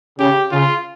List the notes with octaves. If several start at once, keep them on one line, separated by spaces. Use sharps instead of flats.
C#3 G4
C#3 F4